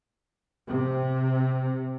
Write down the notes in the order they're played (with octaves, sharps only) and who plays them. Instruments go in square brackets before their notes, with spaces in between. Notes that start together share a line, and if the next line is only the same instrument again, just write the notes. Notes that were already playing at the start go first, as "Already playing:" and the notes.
[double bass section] C3